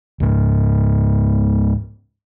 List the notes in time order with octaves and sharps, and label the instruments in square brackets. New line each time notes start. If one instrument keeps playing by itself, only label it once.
[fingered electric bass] C#2 G#2